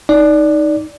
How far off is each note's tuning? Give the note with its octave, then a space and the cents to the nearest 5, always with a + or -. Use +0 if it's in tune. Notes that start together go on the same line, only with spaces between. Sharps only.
D#4 +0 D5 -10